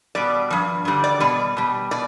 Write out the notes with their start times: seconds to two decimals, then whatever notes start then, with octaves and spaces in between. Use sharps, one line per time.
0.15 B2 G3 D5
0.50 G2 F3
0.85 G2 D3 G3
1.04 D5
1.20 B2 G3 D5
1.57 B2 G3
1.91 B2 D5